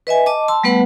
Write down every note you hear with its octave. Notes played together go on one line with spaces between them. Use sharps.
B4 D#5 E5 G#5
D#5 A5 D6
A5 C6 E6
G3 A3 B3 B4 F#5